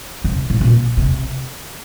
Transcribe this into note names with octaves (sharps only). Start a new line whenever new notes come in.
C3
A2
A#2
C3